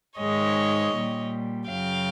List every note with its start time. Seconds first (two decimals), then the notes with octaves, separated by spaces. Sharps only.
0.18 G#2 D#3 G#3 C#5 D#5
0.94 A#2 G3
1.68 F#2 C#3 F#3 F5 G5